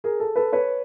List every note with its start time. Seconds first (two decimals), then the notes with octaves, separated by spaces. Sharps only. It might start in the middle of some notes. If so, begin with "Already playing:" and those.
0.04 G#4 A#4
0.20 A4
0.36 A4 B4
0.53 B4 C#5